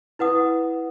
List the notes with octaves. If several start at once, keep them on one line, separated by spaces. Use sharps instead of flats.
E4 B4 F#5 D#6